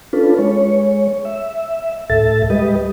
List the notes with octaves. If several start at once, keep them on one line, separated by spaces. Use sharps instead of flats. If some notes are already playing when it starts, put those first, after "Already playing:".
C#4 D4 F4 A4 B4
G#3 C#5
E5
D2 A2 A4 E5 A6
G3 G#3 G4 B4 D#5